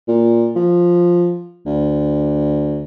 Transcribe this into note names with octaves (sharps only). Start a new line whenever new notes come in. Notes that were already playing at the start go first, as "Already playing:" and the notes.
A#2
F3
D2